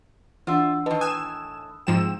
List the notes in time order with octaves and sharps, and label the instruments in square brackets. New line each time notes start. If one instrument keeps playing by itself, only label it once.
[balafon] E3 D4 [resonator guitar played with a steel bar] F4 D5 E5 [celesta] F#5 C6 E6
[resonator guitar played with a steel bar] A2 D#3 [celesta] B4 D#5 A5
[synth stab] G#5 E7 [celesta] D#6 E6 F#6
[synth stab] G#2 F3 E7 [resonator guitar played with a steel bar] C3 D#4 G5